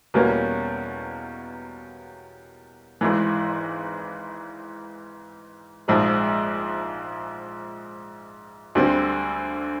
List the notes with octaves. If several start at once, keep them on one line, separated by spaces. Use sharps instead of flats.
E2 B2 G3 A#3 C#4
G#1 G#2 E3
A#1 G#2 F3 G#3
D2 D3 G3 C4